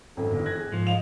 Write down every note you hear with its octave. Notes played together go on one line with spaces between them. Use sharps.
G#1 F#2 A4
G1 E2
F#6 G#6 A#6
G#4
G#2 F3
D#5 F5 F7